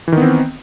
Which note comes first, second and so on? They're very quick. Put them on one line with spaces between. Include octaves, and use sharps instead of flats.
E3 D#3 B3 C4